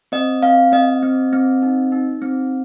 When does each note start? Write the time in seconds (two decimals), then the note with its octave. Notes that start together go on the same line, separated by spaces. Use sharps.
0.12 C4 D#5
0.43 C4 F5
0.72 C4 D#5
1.02 C4
1.33 C4
1.62 D#4
1.92 D#4
2.22 C4